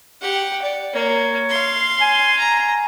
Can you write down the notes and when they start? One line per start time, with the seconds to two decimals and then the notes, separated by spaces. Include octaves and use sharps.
0.21 G4 F#5
0.62 D5
0.93 A#3 C#5
1.50 F5 C6
2.01 G#5
2.39 A#5